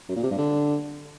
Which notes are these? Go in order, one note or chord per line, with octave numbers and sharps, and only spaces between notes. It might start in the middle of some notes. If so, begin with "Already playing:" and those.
F#2
A#2
C3
G2
D3